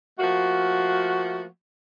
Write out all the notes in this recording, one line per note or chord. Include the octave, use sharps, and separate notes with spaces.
F3 A3 A#3 F#4